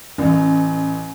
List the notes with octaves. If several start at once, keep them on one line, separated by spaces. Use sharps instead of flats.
A1